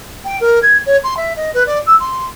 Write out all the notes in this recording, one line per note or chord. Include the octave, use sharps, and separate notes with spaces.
G5
A#4
G#6
C#5
C6
E5
D#5
B4
D5
E6
C6